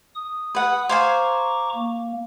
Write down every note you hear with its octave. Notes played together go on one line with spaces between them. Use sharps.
D#6
B4 F#5
C5 F5 G#5 A#5 C#6 D6
A#3